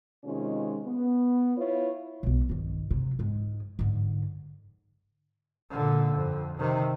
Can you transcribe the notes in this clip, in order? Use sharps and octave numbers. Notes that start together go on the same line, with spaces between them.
C3 D#3 G#3 C#4 F4
B3
E4 F4 B4 C#5
B1 B2
G2 D#3
C3 F#3
G#2 G#3
G#2 D3
A#2 D3
F2
C3 D#3